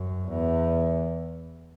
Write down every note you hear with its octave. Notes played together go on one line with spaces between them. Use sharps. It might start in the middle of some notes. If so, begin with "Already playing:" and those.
Already playing: F#2
E2